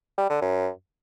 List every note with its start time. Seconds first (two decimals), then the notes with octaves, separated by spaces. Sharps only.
0.18 G3
0.30 D3
0.41 F#2